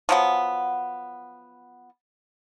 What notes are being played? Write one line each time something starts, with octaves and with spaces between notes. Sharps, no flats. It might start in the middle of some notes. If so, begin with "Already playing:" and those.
F3 F#3 B3